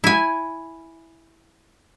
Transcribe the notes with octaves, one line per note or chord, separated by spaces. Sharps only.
E4 G#5